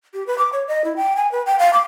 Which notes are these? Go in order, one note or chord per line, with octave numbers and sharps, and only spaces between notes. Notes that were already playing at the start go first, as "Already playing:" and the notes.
G4
B4
D6
C#5
D#5
E4
G5
G#5
B4
G5
F5
D6